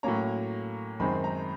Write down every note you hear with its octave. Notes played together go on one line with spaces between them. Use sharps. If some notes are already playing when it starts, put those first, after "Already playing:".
A2 F#3 A#3 C#4 A#5
F#2 D#3 G#3 C4 B5
A#5